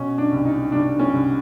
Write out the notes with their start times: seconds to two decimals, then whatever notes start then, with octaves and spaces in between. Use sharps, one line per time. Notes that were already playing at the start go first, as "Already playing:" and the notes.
Already playing: B2 C#4
0.18 D4
0.32 C2
0.45 D#4
0.72 C2 D4
0.99 C#4
1.14 C2